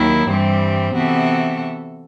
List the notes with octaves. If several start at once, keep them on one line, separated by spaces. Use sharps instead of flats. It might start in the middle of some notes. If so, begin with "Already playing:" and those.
Already playing: D#2 D#3 F#3 E4
G2 E3 G3 C4
C3 E3 B3 F#4 A4